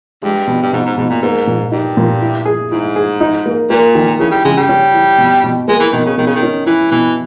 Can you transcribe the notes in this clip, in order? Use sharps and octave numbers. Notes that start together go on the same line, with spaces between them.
G2 G#3
B2
G2
G#2 B2
G#2
G#2 B2
A#2
G#2 A#3
A#2
G2 D#4
A#2
E4
G#4
G#2 E4
G#4
D#4
A#3
A#2 A#3
D#3
C#3 E3
G3
C#3 G#3
G3
C#4
E3
B2
B2
G#3 A#3
E3
B2 D#3
C#3
B2 D#3
C#3
D#3
C#4
E3 E4
B2 E3